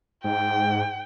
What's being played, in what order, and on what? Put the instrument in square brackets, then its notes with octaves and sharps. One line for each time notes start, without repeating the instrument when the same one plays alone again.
[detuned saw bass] G#2 [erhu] G5